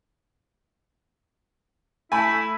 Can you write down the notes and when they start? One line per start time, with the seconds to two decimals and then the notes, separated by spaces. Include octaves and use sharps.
2.12 A3 E4 G#5 B5